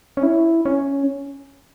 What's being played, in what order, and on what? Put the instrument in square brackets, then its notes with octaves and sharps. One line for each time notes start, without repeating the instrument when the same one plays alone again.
[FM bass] C#4
E4
C#4